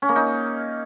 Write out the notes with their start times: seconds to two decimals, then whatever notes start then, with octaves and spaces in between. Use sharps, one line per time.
0.02 C#4
0.09 A#3
0.16 D#4